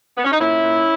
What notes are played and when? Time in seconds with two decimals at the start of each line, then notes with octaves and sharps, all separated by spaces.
0.17 B3
0.25 C#4
0.32 D#4
0.39 A#2 C#4 E4
0.63 A#2